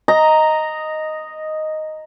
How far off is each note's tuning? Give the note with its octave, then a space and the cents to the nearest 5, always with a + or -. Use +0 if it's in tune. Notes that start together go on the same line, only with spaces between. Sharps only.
D#5 +0 A#5 -5